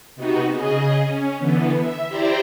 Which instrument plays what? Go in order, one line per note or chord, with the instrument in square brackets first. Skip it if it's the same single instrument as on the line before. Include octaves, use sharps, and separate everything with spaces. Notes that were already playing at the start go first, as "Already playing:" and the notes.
[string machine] C3 B3 D#4 F#4
C#3 G#4 D#5
C#4
D3 E3 B3
E5
E4 G4 C5 D5 E5 A#5